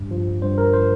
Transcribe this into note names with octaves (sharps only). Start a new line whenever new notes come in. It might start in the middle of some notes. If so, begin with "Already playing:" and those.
Already playing: G2
F3
G2 C5
A#4
F3 C5